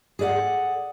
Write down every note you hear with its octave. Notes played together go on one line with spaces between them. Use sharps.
G#4 A4 D5 E5 F#5